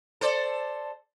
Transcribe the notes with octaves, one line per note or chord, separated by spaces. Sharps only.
A4 C5 D5